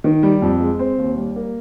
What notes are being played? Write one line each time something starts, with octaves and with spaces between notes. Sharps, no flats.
D#3
G3
F2
G#3
C4
D#2
G3
A#3